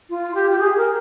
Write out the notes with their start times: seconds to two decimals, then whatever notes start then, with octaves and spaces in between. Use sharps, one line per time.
0.10 F4
0.35 G4
0.51 G4
0.59 G#4
0.77 A#4